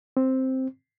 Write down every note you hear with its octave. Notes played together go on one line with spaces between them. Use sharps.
C4